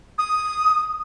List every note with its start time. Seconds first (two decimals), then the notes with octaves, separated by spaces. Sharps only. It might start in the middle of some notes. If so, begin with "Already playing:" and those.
0.18 D#6